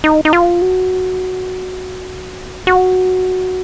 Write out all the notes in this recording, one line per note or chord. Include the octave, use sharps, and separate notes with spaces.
D#4
D#4
F4
F#4
F#4